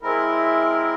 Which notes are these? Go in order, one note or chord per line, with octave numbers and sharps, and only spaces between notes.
G#3 C4 E4 A#4